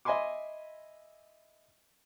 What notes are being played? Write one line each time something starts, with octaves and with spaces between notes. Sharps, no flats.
D#5 E5 G#5 B5 C6 D6